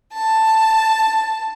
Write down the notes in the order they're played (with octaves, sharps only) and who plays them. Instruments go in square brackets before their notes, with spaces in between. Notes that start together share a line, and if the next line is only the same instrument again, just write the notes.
[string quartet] A5